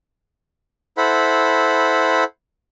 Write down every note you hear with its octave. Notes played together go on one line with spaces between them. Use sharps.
E4 A4 C5 F#5 B5